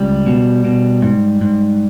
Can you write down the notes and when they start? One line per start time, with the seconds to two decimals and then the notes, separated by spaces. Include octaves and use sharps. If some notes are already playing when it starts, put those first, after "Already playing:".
Already playing: C#2 G3
0.26 B2
0.65 B2
1.02 G#2
1.41 G#2